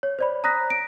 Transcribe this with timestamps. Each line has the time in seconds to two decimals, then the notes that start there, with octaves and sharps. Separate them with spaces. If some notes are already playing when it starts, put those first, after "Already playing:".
0.03 C#5
0.19 C5 D5 B5
0.44 A#5 D#6 F#6 A#6 B6
0.70 D7